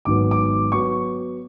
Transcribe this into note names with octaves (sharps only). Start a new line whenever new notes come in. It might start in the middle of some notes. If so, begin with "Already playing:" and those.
G#1 G#2 F#3 B3 D6
D6
F#3 B3 C#6